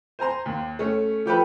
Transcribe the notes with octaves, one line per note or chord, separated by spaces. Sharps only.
C5 G#5 A#5 C6
D#2
A3 C#4
F3 G4 A4 B4